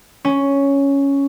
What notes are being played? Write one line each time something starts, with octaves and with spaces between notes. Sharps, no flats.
C#4